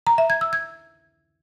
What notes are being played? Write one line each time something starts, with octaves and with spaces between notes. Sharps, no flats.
A#5
E5
G#6
E6
G#6